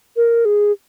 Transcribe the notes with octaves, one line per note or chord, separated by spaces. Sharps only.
A#4
G#4